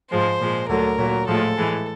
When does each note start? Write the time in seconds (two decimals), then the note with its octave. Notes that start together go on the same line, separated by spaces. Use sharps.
0.11 G#2 F3 G#3 C5
0.40 A#2 F3 G#3
0.69 D2 D3 F#3 A#4
0.98 A#2 F#3
1.27 A2 F3 G#3 A4
1.58 A2 E3 G#3